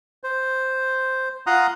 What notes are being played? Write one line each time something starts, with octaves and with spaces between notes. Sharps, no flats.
C5
F4 F#5 A#5 C6 D#6